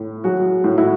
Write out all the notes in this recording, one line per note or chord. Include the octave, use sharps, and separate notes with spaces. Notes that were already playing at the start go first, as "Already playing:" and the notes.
Already playing: A2
F#3 F#4 G#4
A2
E4 F#4